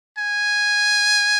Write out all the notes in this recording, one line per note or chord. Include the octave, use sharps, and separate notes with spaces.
G#5